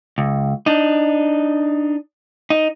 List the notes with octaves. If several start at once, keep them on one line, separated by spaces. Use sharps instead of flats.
C#2
D4 D#4
D#4